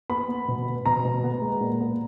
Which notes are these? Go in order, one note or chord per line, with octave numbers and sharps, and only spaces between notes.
B3 B5
B3
B2
B3
B2 A#5
B2
B3
G#3
A#2
B3